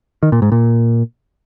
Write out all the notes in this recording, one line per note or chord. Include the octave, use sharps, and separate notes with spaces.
D#3
A#2
G#2
A#2